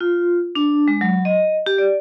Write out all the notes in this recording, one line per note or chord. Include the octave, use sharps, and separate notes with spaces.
F4
D4
G#3
F#3
D#5
G4
D5